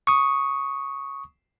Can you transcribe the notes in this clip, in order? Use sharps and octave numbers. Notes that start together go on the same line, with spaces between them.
C#6 D#6